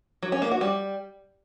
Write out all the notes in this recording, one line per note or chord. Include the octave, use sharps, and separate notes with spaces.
F#3
C#4
A#3
F#4
G3